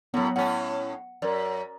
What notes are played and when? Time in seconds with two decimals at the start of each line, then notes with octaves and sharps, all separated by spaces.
0.14 F#2 A2 F#3 B3
0.36 A2 C#4 F#5
1.22 F#2 A#4 D5